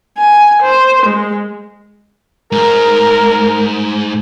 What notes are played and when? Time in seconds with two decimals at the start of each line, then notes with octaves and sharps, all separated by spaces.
0.18 G#5
0.62 C5
1.06 G#3
2.52 G#2 A#4